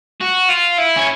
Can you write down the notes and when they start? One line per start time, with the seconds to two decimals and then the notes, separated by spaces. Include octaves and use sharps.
0.21 F#4
0.49 F4
0.78 E4
0.97 C#4